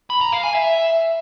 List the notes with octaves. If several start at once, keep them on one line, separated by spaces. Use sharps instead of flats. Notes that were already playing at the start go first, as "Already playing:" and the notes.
B5
A#5
F5
G#5
E5